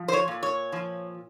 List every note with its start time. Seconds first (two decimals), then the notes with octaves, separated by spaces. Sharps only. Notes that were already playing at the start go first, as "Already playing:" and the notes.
Already playing: F3
0.08 C5
0.13 C#5
0.28 A#2
0.43 C#5
0.72 F3